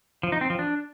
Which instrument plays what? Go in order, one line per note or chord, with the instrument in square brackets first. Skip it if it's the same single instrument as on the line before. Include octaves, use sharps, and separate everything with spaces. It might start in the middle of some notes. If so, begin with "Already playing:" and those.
[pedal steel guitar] F3
D#4
C4
F3
D4